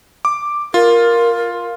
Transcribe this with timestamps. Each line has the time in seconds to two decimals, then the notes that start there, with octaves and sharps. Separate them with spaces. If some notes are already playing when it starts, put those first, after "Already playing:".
0.25 D6
0.74 F4 A#4